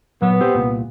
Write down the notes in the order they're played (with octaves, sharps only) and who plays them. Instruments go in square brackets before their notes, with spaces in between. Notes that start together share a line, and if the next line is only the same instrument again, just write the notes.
[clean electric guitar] A#2 F#3 [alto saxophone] B3
[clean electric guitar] C4 G4 C5
C2 A#2